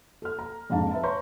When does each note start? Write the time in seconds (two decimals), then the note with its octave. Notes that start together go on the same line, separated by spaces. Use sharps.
0.22 A4 F6
0.39 A#5
0.70 F2 G#2 D4 F5 A5 A#5
0.91 B4 E5 A5
1.03 B4 C#5 A#5 C6 C#6 G6